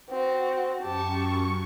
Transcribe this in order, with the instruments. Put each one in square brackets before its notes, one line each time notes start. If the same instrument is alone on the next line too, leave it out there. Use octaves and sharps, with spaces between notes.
[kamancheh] C4 F#4
[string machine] F#2 C#6 [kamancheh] G4 A5